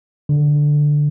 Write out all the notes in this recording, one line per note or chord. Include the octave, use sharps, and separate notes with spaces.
D3